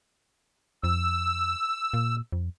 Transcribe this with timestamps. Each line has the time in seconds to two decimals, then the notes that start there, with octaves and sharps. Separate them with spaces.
0.84 F2 E6
1.94 A#2
2.32 F2